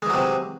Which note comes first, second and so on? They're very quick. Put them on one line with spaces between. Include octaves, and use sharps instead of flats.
G#3 E3 F#3 C3